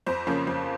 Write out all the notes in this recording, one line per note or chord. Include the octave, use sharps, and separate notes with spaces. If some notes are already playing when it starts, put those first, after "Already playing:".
F2 C5
C#3 F3 A#3 C#4
F2